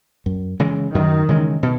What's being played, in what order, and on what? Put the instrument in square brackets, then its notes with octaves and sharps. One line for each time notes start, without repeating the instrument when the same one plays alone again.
[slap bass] F#2
C#3 E3 G#3
[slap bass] F#2 [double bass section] D#3
[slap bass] C#3 E3 G#3
B2